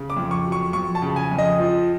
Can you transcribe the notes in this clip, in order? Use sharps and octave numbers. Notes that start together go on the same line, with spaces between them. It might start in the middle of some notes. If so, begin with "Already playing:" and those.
Already playing: C#3
D6
F2
C#6
F#3
C#6
F2 C#6
A5
C#3
G#5
F2
D#5
F3